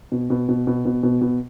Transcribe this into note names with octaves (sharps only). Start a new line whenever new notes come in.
B2
B2
B2
B2
B2
B2
B2